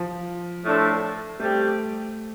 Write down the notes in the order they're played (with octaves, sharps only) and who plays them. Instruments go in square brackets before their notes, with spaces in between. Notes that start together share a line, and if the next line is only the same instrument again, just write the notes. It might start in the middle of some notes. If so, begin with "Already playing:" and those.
Already playing: [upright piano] F3
[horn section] A2 A3 D4 A4 C5
[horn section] G3 C4 G4 [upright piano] A3